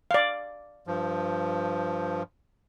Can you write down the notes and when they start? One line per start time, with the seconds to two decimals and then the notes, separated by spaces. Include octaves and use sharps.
0.11 D5 F5
0.87 G2 F3